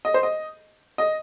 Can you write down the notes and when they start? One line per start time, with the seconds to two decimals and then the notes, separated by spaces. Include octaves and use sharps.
0.05 D#5
0.14 C5
0.23 D#5
0.98 D#5